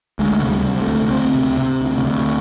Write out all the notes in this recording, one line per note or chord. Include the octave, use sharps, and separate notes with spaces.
D2 G#3
C3
G3
C3
A3
D2
D2 C4
C3
C3
D2
D2